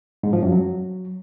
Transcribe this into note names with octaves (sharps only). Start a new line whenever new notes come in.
G#2
F3
F#2
F#3